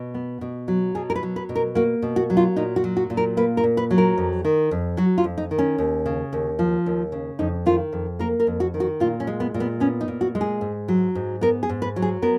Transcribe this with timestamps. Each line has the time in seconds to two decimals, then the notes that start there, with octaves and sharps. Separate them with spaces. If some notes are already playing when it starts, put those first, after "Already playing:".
Already playing: B2
0.14 B3
0.41 B2
0.68 F#3
0.95 B2 G#4
1.10 A#4
1.15 B4
1.23 F#3
1.36 B4
1.49 B2
1.55 A#4
1.75 A#3 F#4
2.02 B2
2.16 F#4
2.30 F#3
2.37 F4
2.56 A#2 D#4
2.76 F#4
2.84 F#3
2.97 F#4
3.10 A#2
3.17 A#4
3.37 A#3 B4
3.57 A#4
3.64 A#2
3.77 B4
3.91 F#3
3.98 A#4
4.18 F2
4.45 D#3
4.71 F2
4.97 F#3 F#4
5.18 F4
5.24 F2
5.38 D#4
5.51 D#3
5.59 C#4
5.78 D#2
6.06 C#3
6.33 D#2
6.59 F3
6.86 D#2
7.12 C#3
7.39 F2 D#4
7.66 D#3 F4
7.92 F2
8.19 A#3 A#4
8.40 A#4
8.47 F2
8.60 F#4
8.74 D#3
8.80 F#4
9.00 A#2 F4
9.20 C#4
9.27 G#3
9.40 B3
9.54 A#2
9.60 B3
9.80 B3 C#4
10.01 D#4
10.08 A#2
10.21 F#4
10.35 G#3
10.41 G#4
10.61 G#2
10.88 F#3
11.15 G#2
11.41 B3 A#4
11.63 G#4
11.69 G#2
11.82 B4
11.96 F#3
12.02 G#4
12.22 B3 A#4